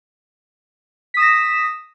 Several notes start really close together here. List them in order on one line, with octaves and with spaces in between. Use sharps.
B6 D#6 E7 A#6